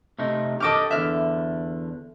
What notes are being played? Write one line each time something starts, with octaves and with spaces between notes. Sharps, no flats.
C3 A3 D#4
G4 A4 D#5 D6 F6
E2 D3 E5 F6